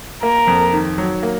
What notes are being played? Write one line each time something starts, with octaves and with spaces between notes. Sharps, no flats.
A#3 A#4
F2
D#3
F#3
A#3